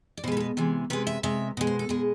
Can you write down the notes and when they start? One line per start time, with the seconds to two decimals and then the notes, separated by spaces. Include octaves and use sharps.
0.17 D5
0.24 B2 C5
0.28 G#3 B4
0.37 A4
0.40 B4
0.57 C3 E3 G#3
0.90 C3 G#3 B4
1.07 E5
1.23 C3 G#3 E5
1.57 B2 G#3
1.67 C5
1.79 A4
1.89 B2 G#3 G#4